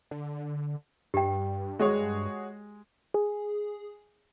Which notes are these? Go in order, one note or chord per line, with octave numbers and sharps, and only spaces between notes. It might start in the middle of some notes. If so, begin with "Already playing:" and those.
D3
G2 G4 G5
G#3 F#4 G#4 C#5
G#4